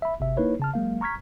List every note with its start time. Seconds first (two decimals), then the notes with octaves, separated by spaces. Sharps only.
0.02 E5 B5
0.20 G#1 C3 E5
0.37 A#3 D#4 E4 B4 C#5
0.60 C#3 A5 F6
0.74 F#3 G#3 A#3 F5
1.01 A#5 C#6 F6 G#6 B6